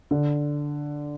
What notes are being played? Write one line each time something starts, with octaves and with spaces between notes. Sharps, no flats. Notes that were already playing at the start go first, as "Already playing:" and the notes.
D3